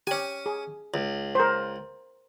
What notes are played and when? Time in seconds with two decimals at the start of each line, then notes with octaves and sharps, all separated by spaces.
0.07 C#4 G4 G#5
0.46 G#4
0.94 C#2
1.35 A#4 C5